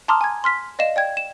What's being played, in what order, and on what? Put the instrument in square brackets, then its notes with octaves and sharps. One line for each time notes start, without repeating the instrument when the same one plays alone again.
[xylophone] A5 A#5 C6 D6 D#6 F6
G#5 G#6
C6 F6 B6
D5 D#5 F5 E7
D5 G5 G#6
E7